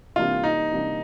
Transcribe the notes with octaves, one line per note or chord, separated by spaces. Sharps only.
C3 E3 G3 A#3 D4 F4
D#4
C3 E3 G3 A#3 D4